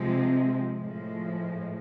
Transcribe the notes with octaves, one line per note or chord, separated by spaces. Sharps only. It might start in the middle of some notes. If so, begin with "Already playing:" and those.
Already playing: C3 F3 G#3 C4
A2 F3 G#3